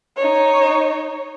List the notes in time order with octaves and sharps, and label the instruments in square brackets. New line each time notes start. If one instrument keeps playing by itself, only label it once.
[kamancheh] D#4 C#5